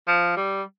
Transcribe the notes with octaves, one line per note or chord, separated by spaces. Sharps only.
F3
G3